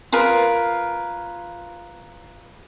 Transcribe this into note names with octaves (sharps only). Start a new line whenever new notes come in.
F4 G#4 A#4 B4